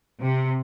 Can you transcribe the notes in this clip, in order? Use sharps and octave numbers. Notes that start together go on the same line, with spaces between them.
C3